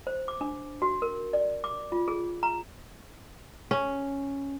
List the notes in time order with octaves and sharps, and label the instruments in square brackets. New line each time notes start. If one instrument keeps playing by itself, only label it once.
[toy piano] C5
D6
D4
F#4
A#4
D5
D6
F4
G#4
A#5
[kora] C#4